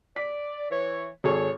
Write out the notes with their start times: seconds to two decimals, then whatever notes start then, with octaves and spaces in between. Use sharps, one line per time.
0.16 D5 B6
0.70 E3 C#5
1.24 G#1 G#4 A4 C#5